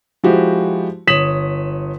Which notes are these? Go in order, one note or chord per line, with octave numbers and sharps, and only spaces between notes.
F3 G#3 E4 F#4 G4
G1 C#5 D#6 B6 E7 F#7